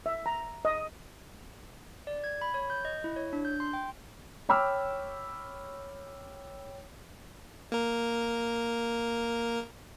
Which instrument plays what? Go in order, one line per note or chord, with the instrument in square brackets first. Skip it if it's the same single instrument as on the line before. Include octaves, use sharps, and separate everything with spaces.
[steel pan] E5
A#5
D#5
[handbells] D5
G#6
B5
C#5
G6
D#5
E4
C#5
D4
G6
C6
G5
[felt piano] C#5 G5 B5 D6 E6 F6
[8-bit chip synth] A#3 A#4